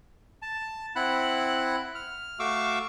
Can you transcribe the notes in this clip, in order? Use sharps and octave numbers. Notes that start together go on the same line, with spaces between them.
A5
C4 E4 F#5 B5 F#6
F6
A3 F#4 F5 C#6 D6 E6